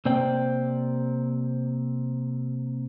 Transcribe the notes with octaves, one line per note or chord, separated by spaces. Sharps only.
C3 A#3 C5 D5 G5